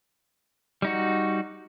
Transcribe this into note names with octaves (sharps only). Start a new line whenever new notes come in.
G3 D#4 F#4